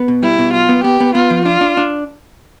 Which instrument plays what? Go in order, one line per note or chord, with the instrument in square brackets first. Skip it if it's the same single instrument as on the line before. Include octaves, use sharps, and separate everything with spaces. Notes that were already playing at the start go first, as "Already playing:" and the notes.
Already playing: [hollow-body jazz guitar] B3
B2
[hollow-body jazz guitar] G3 [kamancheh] E4
[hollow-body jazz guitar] B2
[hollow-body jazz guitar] B1 [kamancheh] F4
[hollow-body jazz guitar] B3
[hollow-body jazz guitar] B3 [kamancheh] G4
[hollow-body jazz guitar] B3
[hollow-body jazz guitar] B3 [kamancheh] F4
[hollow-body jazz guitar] F3
[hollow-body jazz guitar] D4 [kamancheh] F4
[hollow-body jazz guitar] D4
D4